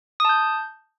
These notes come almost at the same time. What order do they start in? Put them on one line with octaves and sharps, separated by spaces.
D#6 A5 G6